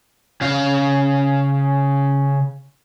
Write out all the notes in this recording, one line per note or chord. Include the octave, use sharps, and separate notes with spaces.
C#3 F5